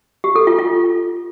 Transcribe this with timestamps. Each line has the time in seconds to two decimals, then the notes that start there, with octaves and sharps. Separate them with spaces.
0.24 G4
0.35 A4
0.47 F4
0.59 F4